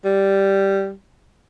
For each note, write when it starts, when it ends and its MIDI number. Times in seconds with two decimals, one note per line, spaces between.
0.05 0.92 55